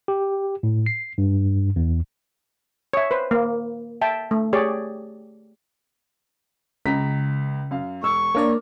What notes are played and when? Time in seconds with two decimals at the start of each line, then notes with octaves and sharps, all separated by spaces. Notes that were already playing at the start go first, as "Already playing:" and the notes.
0.08 G4
0.63 A2
0.86 C7
1.18 G2
1.76 E2
2.93 C#5 E5
3.11 B4 C5
3.31 A#3
4.02 E5 G5 A5
4.31 A3
4.53 G4 G#4 C#5 D5
6.85 C#2 C#3 A#5 B6
7.71 F#2 F5
8.03 E1 C#6 E6
8.35 A#3 D4 A#4 C#5 D5